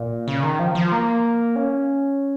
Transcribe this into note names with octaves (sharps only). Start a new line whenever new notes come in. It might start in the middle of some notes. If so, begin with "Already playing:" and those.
Already playing: A#2
C#3
D#3
F3
F3
A#3
C#4